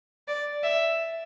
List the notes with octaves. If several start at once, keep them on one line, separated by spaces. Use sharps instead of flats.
D5
E5